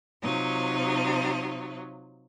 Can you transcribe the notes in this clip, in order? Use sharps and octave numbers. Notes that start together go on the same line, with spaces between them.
C3 F#3 D#4 F4